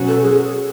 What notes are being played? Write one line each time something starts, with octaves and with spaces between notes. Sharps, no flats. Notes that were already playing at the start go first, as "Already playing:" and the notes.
Already playing: B2 F#3 C#4 F#4
A4
G#4